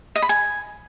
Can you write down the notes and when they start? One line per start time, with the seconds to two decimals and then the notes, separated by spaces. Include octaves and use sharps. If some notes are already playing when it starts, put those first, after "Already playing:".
0.15 D#5
0.22 B5
0.29 G#5